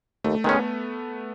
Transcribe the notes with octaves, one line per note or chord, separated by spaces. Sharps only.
D#2 A3
D#3 G#3 B3 C#4